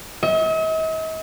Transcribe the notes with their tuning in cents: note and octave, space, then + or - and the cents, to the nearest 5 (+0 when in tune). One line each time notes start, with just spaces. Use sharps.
D#5 +45